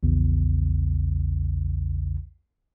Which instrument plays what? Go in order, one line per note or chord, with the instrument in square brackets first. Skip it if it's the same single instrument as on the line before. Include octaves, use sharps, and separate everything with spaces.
[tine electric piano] A#1 E2 C#3